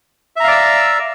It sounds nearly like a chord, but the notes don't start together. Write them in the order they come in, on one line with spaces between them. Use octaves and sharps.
E5 A#5 F5 D5 E6